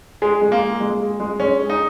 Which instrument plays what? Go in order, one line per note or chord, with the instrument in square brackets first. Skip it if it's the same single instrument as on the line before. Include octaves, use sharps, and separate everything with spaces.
[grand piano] G#3 [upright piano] G#4
[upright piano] G#3
[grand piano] A#3
[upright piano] G#4
G#3
G#4
G#3
[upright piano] G#3 [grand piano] C#4
[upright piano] G#4
[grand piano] D#4